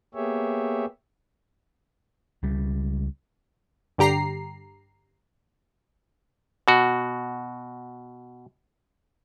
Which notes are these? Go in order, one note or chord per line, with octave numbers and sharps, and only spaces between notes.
A#3 B3 G4 G#4 C#5 E5
C#2 C#3 G3
G2 D3 G4 A#5 C7
B2 F#4